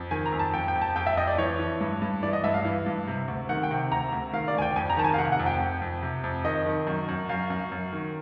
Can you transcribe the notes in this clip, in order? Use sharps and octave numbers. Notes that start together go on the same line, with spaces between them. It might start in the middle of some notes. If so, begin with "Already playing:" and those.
Already playing: F2
D#3 G#5
A#5
F2
A5
F2 G5
G5
F2
A5
F2 G5
E5
F2 D#5
D5
E3 C#5
E3
G2
G2
E3 D5
D#5
G2 E5
F5
E3
G2
C3
D2
D#3 F#5
G5
C3
D2 A#5
D2
D#3 F5
D5
D2 G#5
G5
F2 G#5
A#5
D#3 A5
G#5
F5
C3 F#5
F#5
F2
G5
F2
F2
C3
F2
D#3 D#5
D#3
F#2
F#2
F#2 F5
F#2
F#2
D#3